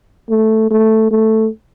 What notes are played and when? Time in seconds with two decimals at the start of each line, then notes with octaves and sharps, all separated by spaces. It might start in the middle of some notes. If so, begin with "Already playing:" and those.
0.29 A3
0.70 A3
1.11 A3